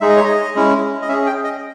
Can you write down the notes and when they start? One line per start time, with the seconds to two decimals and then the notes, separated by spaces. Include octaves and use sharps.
0.01 G#3 D#4 G#4 E5
0.09 D#5
0.17 C#5
0.25 D#5
0.55 G#3 C#4 E4
1.02 D#5
1.08 C#4 E5
1.13 G#4
1.27 G5
1.44 D#5